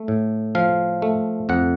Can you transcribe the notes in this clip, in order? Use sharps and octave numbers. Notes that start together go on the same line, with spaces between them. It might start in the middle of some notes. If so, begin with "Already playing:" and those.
Already playing: A3
A2
F3 F5
A3
F2 F#5